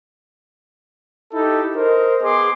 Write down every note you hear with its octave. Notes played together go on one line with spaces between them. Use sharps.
D#4 E4 G4 A4
A#4 C5 D#5
B3 G#4 C6 D6